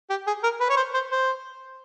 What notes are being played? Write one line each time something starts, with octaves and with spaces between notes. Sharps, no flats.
G4
G#4
A#4
B4
C#5
C5
C5
C5